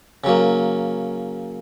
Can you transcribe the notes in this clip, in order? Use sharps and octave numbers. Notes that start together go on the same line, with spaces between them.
C#3 F#3 A#3